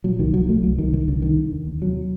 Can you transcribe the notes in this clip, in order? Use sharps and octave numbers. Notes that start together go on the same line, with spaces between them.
A#2 F#3
C2 D#3
C2 F#3
C2 A3
C2 F#3
C2 D#3
C2 D#3
C2 D3
D3 D#3
D3
D#2
D#2
C3 F#3